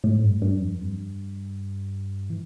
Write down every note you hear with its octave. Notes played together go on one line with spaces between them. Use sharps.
A2
G2
G2
F2
G2
E3